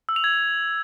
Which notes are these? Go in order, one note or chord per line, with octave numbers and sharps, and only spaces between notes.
E6
F7
G#6